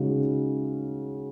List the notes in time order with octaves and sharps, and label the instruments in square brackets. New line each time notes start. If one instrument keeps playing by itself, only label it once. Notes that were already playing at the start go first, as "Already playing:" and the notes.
Already playing: [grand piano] C#3 G#3 D#4 F#4